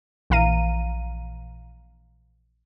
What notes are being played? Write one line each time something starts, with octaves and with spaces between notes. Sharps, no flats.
A#1 E3 F5 A#5 D#7